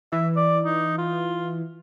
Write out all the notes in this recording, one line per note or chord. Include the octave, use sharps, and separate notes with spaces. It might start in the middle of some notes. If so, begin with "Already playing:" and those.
E3 E5
D5
D#4
F4